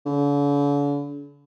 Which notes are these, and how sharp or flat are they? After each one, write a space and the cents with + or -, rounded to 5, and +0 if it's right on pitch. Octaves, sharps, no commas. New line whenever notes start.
D3 -45